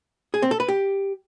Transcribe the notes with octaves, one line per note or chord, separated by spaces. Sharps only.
G#4
C4
A4
B4
G4